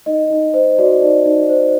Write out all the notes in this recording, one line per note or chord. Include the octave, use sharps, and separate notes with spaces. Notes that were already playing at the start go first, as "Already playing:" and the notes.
D#4 D#5
D#4
C5
F#4 D5
D#4
D#4
C5